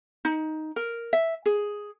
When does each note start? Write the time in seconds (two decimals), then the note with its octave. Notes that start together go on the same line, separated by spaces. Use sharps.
0.25 D#4
0.76 A#4
1.13 E5
1.46 G#4